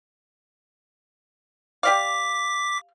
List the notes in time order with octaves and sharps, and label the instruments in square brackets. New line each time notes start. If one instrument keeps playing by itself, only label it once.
[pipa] G4 D5 F5 [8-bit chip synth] D6 B6